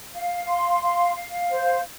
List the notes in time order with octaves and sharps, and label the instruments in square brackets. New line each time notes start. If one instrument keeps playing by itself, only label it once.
[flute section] F5
C6
F5
F5
C5